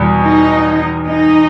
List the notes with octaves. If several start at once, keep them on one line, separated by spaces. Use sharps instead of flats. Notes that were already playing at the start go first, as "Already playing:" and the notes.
Already playing: E2 B2 G3
D#4
D#4